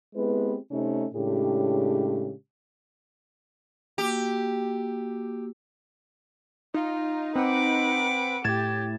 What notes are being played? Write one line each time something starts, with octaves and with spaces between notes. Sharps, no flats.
G#3 B3 C4 E4 G4 B4
C3 A3 C4 C#4 D#4
A2 C#3 G#3 D4 G4
A#3 F#4 G4 E6
D#4 F4
C4 B4 F#5 D6
A2 G4 G#6 A6 E7